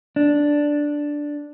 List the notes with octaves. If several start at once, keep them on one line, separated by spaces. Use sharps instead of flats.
D4